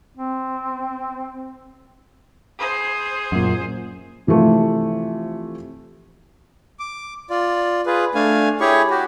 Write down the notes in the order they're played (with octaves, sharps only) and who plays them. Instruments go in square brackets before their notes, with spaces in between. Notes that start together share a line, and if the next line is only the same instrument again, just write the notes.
[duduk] C4
[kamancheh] G#4 C5
[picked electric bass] F#2 A#2
[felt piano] C3 E3 F3 A3 F4
[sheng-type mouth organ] D6
F4 D5
F4 G#4 B4
A3 D4 F5 G#5
E4 G4 G#4 C#5 C#6
F#4 G4